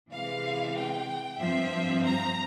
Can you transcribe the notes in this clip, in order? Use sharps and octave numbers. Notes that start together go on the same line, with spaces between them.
C3 E3 G#3 F5
G5
G2 F3 C4 E5
A#5